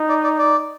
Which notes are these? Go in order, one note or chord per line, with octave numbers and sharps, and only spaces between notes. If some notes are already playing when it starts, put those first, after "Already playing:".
Already playing: D#4
D5
D5
D5